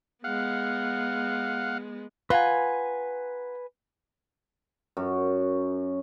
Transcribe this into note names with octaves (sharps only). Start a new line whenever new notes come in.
G#3 B3 F5 F#5
F4 B4 F#5 G#5 A#5
F#2